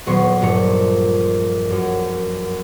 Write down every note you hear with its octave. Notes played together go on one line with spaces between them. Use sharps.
D#1 F#3 B3 C6 C#6
A#1 G2 F3 A#5 C#7
F#2